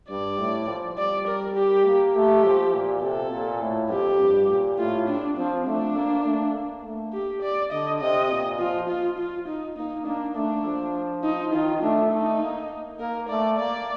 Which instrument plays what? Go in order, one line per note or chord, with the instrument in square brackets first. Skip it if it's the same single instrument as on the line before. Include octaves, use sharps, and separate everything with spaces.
[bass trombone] G2 [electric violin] D5
[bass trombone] A2
F3
[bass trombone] G3 [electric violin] D5
[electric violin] A#4
G4
[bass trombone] A#3
[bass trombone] A3 [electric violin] G4
[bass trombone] F3
A#2
[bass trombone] C3 [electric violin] A4
[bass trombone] A#2
A2
[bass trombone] F2 [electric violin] G4
[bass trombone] G2
A#2
[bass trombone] A2 [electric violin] F4
[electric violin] D4
[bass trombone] F3 [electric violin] C4
[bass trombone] A3 [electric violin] D4
[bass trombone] A#3
A3
A#3
A3
[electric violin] G4
D5
[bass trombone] D3 [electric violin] D#5
[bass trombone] C3 [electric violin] D#5
[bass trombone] A#2
[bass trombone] F3 [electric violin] F4
[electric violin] F4
F4
D#4
[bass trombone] A#3 [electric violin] D#4
[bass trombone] A#3 [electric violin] D4
[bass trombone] A3 [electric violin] D4
[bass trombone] F3
[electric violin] D#4
[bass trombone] D#3 [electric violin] F4
[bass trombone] A3 [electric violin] D4
[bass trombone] A3 [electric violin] D#4
[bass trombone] A#3
[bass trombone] A#3 [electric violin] A#4
[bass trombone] A3 [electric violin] D5
[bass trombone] A#3 [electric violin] D5